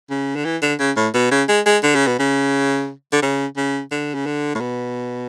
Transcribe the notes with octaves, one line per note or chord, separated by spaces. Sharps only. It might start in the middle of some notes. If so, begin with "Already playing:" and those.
C#3
D3
E3
D3
C#3
A2
B2
C#3
G#3
G#3
D3
C#3
B2
C#3
D3
C#3
C#3
D3
C#3
D3
A2
B2